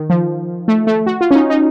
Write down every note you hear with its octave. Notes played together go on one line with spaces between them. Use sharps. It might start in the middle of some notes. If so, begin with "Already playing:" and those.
Already playing: D#3
F3
A3
A3
F#4
F4
C#4
D#4
D#4